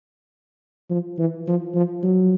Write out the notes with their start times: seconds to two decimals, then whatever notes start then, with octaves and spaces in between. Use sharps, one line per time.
0.90 F3
1.18 E3
1.47 F3
1.75 F3
2.03 F#3